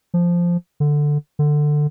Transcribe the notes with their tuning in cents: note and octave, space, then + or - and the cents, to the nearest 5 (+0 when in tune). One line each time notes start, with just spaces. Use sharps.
F3 -5
D3 +5
D3 +15